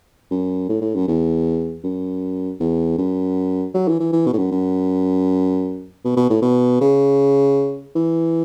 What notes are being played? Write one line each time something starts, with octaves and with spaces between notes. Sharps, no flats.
F#2
A2
A2
F#2
E2
F#2
E2
F#2
F#3
E3
E3
E3
B2
A2
F#2
F#2
B2
B2
A2
B2
C#3
E3